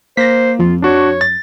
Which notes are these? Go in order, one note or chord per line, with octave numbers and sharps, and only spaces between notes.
A#3 C5 A#6 B6
F2 F4
D4 F#4 C#5
A6